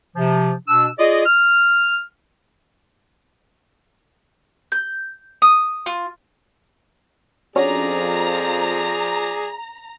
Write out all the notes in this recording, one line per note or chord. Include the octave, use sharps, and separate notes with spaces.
C3 F3
B2 D4 E6
F4 G#4 D5 D#5
F6
G6
D#6
F4
F2 F3 C#4 D4 F#4 G#4 D5 A#5